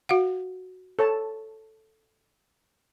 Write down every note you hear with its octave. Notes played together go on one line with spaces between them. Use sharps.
F#4 F5 F#5
A4 C#5 A5